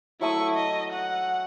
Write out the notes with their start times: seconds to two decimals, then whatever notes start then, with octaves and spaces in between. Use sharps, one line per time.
0.21 F#3 A3 E4 C#6 D#6
0.55 D#5
0.93 F#5